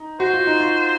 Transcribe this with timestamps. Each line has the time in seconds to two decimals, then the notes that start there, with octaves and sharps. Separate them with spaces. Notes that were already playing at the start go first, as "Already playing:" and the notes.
Already playing: D#4
0.20 F#4 C5
0.34 F4
0.47 D#4
0.60 F4